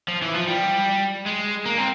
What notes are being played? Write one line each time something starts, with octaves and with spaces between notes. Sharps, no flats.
F3
E3
F3
G3
G#3
A#3
C4